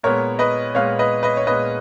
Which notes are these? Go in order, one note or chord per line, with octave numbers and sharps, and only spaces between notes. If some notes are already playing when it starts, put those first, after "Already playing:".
A#2 G#3 B3 A#4 C#5
B4 D#5
A#2 G#3 B3 C#5 F5
B4 D#5
B4 D#5
C#5
A#2 G#3 B3 B4 D#5